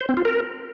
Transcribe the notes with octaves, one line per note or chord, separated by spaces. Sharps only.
C5
C4
F4
A#4